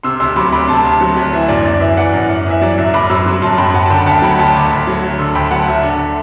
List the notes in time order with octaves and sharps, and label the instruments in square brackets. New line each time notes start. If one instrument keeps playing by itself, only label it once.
[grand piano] C3 C6 E6
D2 C6 E6
F#3 B5 D6
D2 B5 D6
C3 A5 C6
D2
F#3
D2
E3 E5
F#2 D5
F#2 D5
E3 E5
E3 D5 F#5
F#2
F#2
E3 E5
F#3 D5
F#2 E5
F#2 B5 D6
F#3 C6 E6
F#3
F#2 A5 C6
F#2 G5 B5
F#3 F#5 A5
A5
D3 G5 B5
D2 F#5 A5
F#3 G5 B5
D2 A5 C6
D3 B5 D6
D2
F#3
D2
D3 C6 E6
D2 G5 B5
F#3 F#5 A5
F#5
D2 E5
D3